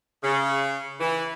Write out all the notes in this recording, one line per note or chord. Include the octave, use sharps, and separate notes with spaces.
C#3
E3